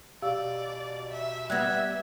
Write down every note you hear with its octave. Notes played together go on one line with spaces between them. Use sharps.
B2 G4 D5 F5 E6
E5
G3 B3 E5 F#6 G#6 A#6